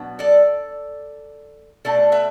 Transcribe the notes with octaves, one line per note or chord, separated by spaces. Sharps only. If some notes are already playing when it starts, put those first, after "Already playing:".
Already playing: B2 F#3 B3 D4
A4 D5
B2 A3 D4 A4 D5
B4 E5